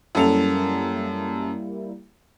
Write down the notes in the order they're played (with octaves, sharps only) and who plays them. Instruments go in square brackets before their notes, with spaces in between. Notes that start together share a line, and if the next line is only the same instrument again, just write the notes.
[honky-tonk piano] F#2 A4 F7 [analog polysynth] G3 A#3 E4